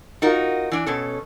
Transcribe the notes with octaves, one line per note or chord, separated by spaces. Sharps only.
D#4 F4 F#4 A#4
E3 D4
B2 C#4 A4